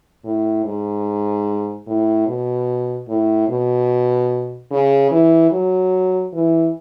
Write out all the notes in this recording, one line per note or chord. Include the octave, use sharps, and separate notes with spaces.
A2
G#2
A2
B2
A2
B2
C#3
E3
F#3
E3